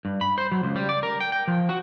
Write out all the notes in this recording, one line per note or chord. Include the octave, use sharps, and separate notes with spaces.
G2
B5
C5
F#3
C#2
G3
D5
A#4
G5
G5
F3
F#4